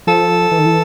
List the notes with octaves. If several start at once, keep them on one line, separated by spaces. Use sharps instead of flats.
F3 A4
E3
D#3
E3